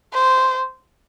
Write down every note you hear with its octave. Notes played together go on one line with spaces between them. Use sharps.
C5